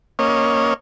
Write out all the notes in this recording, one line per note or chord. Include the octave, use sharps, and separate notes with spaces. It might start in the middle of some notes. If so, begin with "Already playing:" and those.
A#3 C#4 C#5 D#5